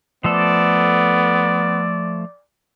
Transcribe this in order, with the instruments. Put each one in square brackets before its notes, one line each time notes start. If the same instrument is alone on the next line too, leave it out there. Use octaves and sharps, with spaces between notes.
[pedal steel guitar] F3 A3 A4 [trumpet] B3 [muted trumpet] D5